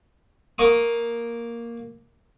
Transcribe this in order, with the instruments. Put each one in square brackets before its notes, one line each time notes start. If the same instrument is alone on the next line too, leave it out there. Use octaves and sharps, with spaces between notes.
[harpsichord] A#3 C#6 D#6